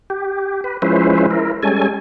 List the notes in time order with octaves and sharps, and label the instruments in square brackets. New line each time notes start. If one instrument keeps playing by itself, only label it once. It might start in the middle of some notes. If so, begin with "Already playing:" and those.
[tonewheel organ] G4
B4
F3 G#3 C#4 E4 B4 C5
E4 A#4
G3 G#3 C#4 A4 G#5